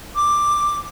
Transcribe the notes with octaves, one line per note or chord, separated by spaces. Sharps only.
D6